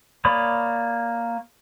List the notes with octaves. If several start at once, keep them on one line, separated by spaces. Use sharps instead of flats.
A#3 C#5 D5 B5 D#6